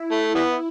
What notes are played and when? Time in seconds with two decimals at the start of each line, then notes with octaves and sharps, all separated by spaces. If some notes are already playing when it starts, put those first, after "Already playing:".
Already playing: E4
0.11 A3
0.35 E3 G3 B3